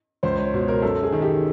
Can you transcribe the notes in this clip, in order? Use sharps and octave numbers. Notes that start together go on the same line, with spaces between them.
C#2 C5
C#5
B2
A#4
F#2 A4
G#4
D#3
G4